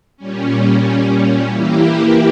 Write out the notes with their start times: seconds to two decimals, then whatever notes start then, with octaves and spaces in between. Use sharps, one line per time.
0.17 A#2 G3 C#4
1.45 E3 A#3 E4 G4